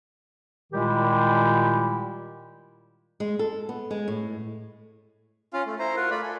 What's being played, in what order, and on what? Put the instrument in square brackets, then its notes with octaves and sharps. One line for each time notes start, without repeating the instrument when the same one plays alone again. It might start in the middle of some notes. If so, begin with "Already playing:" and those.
[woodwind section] A#2 D#3 G3 G#3 E4 G4
[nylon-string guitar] G#3
A4
B3
G#3
A2
[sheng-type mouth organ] C#4 F4 F5
A3
E4 C5 A#5
F4 F#4 A#4
A3 F4 D5 B5
A4 G#5